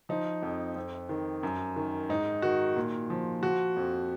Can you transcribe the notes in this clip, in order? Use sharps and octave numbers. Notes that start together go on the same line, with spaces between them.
F3 D#4
F2
F2
D#3
F#2
D#3
G#2 D#4
D#3 F#4
A#2
F3
F3 F#4
F2